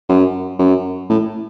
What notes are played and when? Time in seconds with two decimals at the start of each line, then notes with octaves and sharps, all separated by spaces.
0.09 F#2
0.59 F#2
1.10 A2